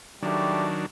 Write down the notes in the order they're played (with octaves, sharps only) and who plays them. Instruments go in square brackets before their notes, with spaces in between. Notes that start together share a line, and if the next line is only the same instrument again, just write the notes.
[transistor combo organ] D#3 F#3 D4 [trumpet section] G3 A3 G4